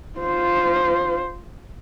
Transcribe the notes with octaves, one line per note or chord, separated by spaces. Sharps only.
F4 C5